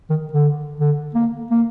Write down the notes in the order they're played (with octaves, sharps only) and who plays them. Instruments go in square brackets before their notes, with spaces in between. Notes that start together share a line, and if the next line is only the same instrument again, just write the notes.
[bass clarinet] D#3
D3
D3
A#3
A#3